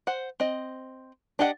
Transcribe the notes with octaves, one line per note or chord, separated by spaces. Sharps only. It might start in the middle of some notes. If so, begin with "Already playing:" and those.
C5 F#5
C4 D#5
D4 G4 D#5 F#5